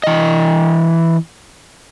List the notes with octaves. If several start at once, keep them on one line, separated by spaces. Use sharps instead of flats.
E3 D#5